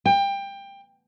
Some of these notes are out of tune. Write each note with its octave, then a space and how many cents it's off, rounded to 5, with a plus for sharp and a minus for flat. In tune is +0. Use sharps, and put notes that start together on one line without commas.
G5 +20